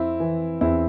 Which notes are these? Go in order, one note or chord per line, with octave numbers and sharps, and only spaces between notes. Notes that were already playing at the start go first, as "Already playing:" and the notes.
Already playing: F2 C4 E4
E3
E2 C4 E4